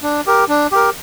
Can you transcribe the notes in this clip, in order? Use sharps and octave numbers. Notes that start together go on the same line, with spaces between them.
D4
G4 A#4
D4
G4 A#4